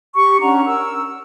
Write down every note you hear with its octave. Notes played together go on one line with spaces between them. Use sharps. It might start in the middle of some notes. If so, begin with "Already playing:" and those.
G4 C#6
C#4 D4 F#5 A#5
A#4 E6